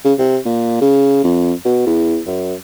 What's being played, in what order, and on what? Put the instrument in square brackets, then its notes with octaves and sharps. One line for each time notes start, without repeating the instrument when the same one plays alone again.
[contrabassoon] C#3
C3
A#2
C#3
F2
B2
E2
F#2